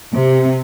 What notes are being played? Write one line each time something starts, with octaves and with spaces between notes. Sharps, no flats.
C3